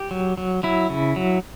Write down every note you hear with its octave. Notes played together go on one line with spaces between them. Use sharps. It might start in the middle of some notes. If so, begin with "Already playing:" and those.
Already playing: G4
F#3
F#3
F#3 E4
C#3
F#3